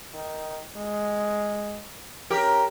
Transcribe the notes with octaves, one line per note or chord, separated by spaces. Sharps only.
D#3
G#3
C#4 G4 A#4